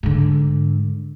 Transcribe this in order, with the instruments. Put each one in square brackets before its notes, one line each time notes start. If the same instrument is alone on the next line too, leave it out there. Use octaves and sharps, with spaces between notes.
[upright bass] G#2 D3